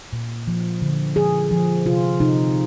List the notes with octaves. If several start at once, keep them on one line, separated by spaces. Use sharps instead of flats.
A#2
F3
D3
F3 G#4
F3
C3 F4
C3 D#4